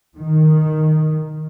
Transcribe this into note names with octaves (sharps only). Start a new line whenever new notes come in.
D#3